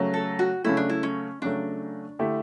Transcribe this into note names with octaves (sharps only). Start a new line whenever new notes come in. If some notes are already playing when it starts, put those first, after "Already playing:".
Already playing: C#3 F#3 A3
A4
F#4
C#3 F#3 A3 E4
D4
E4
C#4
C#3 F#3 A3 D4
D3 A3 E4 G4